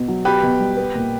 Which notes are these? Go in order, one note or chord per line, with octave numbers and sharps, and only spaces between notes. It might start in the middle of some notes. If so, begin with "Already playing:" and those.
Already playing: B2 B3
F#3
B3 G4 B4
B2
G3
B3
A#2